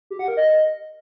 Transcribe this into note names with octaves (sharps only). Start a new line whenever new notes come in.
G4
F#5
A#4
D#5